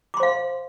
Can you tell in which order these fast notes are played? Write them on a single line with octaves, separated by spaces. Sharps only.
D6 C6 C5 F5